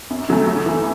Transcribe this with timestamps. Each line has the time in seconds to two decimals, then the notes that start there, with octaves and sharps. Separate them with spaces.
0.10 F#2
0.28 C#3 F#3 A3
0.46 F#2
0.66 E3 A3